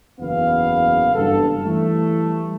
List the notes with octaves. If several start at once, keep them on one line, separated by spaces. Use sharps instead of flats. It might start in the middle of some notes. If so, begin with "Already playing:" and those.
F#1 E2 B3 F5
F#1 G2 A4
E3 G3 A3